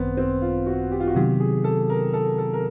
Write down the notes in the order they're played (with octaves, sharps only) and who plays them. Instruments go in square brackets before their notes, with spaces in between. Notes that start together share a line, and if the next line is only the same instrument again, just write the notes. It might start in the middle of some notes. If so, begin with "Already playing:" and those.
Already playing: [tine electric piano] G#1 F#2 D#3 [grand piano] B3 C4
[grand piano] C4
F4
F#4
G4
F4
F#4
[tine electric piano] C3 D#3 F#3 B3 D#4 [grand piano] G4
[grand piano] G#4
A4
A#4
A4
A4
A#4